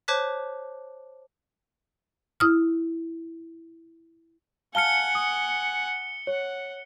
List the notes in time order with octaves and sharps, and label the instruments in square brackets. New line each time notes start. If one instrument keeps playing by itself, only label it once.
[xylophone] C5 C#5 A5 D6 F#6 B6
[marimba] E4 D#6 F6
[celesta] F5 A5 F6 [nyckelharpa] F#5 G#5 [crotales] C#7 G7
[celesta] D#6
[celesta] C#5 [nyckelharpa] F#5